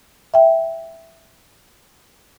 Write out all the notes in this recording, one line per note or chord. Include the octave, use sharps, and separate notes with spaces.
E5 G5